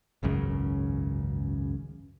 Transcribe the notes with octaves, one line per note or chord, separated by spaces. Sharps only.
G#1 C#2 F#2 C#3